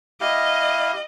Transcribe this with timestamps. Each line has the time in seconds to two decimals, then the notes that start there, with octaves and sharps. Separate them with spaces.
0.21 E4 G4 D#5 F5